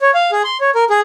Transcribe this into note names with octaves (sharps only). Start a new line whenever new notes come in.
C#5
F5
G#4
C6
C#5
A#4
G#4